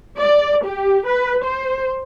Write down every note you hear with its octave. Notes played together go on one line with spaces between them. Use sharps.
D5
G4
B4
C5